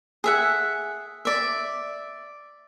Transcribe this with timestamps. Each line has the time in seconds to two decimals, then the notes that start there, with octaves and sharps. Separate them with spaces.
0.24 G#4 E5 F#5
1.25 D5 E5